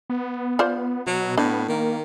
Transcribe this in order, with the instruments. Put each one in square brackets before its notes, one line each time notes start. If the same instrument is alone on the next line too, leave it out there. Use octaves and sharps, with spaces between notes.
[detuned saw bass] B3
[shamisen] F4 C5 D5
[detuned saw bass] B2 [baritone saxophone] F#3
[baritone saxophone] A2 [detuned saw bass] B3 [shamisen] D4
[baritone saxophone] D#3 [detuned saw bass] A#3